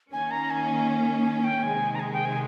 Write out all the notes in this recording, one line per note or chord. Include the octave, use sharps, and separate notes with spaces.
D#3 A#3 C#4 G#5
A#5
G#5
G#5
G5
C3 D#3 G#3 G#5
A#5
G#5
G5
G#5